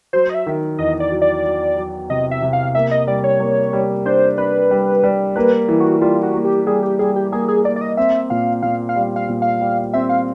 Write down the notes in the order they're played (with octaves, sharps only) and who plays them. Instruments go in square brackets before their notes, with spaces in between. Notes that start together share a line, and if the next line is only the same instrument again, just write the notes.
[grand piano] F#3 [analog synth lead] C5
[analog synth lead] D#5
E5
[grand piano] D#3
[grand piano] E2 [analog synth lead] D#5
[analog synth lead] D5
[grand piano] F#3
[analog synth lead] D5
[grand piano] F#3
F#3
[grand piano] C3 [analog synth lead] D#5
[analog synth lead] E5
[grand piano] C3
[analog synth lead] F5
[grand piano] A#3 [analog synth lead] E5
[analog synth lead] D#5
[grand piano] G3 [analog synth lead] D5
[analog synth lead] C#5
[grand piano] A#3
G3
[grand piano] D4 [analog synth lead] C5
[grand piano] D4 [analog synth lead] B4
[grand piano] G3
G3
[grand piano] A#3 [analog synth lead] B4
[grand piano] E3
[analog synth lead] F#4
[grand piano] G3 [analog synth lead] F4
[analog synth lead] F#4
[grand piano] A#3
[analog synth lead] G4
[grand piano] G3 [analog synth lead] G#4
[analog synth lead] G4
[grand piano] G3 [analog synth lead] G#4
[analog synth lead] G4
[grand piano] A#3 [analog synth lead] G#4
[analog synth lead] G#4
[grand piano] A#3 [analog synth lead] D5
[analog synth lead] D5
D#5
[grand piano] C4 [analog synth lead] E5
[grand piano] A#2 [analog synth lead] F5
[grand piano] A#2 [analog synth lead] F5
[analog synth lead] F5
[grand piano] G3
[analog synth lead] F5
[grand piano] A#2
[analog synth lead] F5
[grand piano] G3
[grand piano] C4 [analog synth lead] E5
[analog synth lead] F5